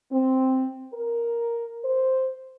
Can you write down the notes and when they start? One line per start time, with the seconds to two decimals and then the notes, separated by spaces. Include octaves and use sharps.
0.12 C4
0.93 A#4
1.84 C5